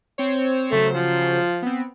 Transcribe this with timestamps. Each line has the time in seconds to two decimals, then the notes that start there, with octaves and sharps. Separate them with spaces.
0.18 C4 C5 C#5
0.72 C#3 F#3 A3 C5
0.92 F3
1.62 B3 C4